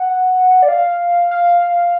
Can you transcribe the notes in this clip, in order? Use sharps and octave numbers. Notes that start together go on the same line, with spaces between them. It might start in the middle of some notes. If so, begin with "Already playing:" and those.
Already playing: F#5
D5
F5
F5